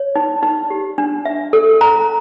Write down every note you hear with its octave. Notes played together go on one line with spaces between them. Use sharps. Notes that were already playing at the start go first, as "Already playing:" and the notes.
Already playing: C#5
D#4
D#4
G4
D4
E5
A4
A#5